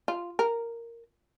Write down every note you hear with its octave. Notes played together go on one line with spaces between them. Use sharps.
F4
A#4